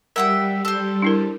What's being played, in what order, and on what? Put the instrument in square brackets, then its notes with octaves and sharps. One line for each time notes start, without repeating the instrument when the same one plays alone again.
[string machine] G3 [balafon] A#4 [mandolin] E5 F#5 G5
[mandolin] A4 C5
[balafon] D4 E4 A#4